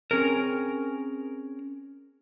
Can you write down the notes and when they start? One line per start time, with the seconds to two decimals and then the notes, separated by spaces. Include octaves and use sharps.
0.11 C4 C#4 G#4 A#4